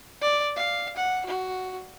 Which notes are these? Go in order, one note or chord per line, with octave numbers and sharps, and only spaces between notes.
D5
F5
F#5
F#4